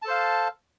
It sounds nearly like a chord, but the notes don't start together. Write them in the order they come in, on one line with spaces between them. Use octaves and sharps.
A5 A4 C5 F5